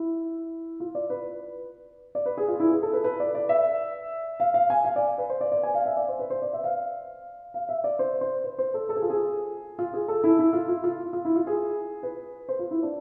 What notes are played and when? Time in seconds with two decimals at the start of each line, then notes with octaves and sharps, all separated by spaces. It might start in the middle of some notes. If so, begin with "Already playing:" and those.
Already playing: E4
0.80 F4
0.95 D5
1.10 B4
2.15 D5
2.26 B4
2.37 G#4
2.48 F4
2.60 E4
2.71 G#4
2.83 A4
2.93 B4
3.04 B4
3.20 D5
3.35 D5
3.49 E5
4.40 F5
4.54 F5
4.70 G#5
4.85 F5
4.96 D5
5.18 B4
5.30 C5
5.41 D5
5.52 D5
5.63 G#5
5.74 F5
5.86 E5
5.97 D5
6.08 C5
6.19 B4
6.30 C5
6.42 D5
6.53 E5
6.64 F5
7.54 F5
7.69 E5
7.84 D5
7.99 C5
8.21 C5
8.44 B4
8.58 C5
8.74 A4
8.89 A4
8.96 G#4
9.02 F4
9.10 G#4
9.79 F4
9.94 G#4
10.08 A4
10.24 E4
10.39 E4
10.53 F4
10.68 F4
10.84 F4
11.13 F4
11.25 E4
11.36 F4
11.47 G#4
12.03 B4
12.49 C5
12.59 F4
12.71 E4
12.82 D4